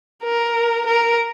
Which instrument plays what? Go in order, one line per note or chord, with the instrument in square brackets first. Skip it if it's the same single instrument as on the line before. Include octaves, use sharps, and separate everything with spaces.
[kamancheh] A#4
A#4